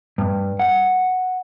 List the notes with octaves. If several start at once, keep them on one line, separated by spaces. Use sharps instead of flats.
G2
F#5